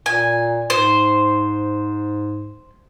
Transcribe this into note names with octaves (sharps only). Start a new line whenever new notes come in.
A#2 G#5
G#2 C5